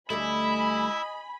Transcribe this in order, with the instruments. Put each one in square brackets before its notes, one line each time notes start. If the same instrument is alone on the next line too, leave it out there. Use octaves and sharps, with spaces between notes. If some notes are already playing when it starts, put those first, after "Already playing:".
[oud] D2 G3 A3 [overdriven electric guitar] E4 [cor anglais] D#5 [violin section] G#5 B5